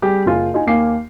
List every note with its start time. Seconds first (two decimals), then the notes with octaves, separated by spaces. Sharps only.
0.02 G3 G4 G#4
0.26 F#1 F4 G#5
0.54 D#4 F4 G#5
0.67 D#2 A#3 F5 G#5 D6 C7